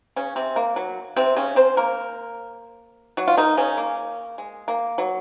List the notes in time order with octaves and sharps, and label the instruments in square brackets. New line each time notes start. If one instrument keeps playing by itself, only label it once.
[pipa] C#3 C#4
C3 C4
A#3
F#3
C3 C4
C#3 C#4
C4 C5
A#3 A#4
F#3 F#4
F4
D#3 D#4
C#3 C#4
A#3
G#3
A#3
F#3